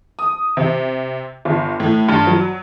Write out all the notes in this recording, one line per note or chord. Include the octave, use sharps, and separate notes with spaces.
D#6
C3
G1
A2
G2
F#3